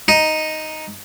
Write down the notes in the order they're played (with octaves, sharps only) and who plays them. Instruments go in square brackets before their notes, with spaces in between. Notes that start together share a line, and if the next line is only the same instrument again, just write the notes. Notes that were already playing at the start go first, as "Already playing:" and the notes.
[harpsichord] D#4